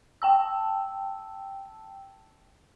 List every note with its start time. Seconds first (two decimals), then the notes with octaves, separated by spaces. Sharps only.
0.22 G5 A5 E6